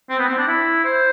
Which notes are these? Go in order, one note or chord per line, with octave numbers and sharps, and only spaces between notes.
C4
B3
C4
D4
E4
C5